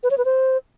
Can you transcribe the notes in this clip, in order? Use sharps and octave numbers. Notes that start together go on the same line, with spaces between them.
B4
C#5
B4
C5